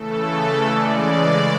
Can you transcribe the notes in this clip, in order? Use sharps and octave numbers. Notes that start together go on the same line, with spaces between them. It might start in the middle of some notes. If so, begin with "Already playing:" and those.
Already playing: C#3 E3 A3 A4
C#3 E3 G#3 D5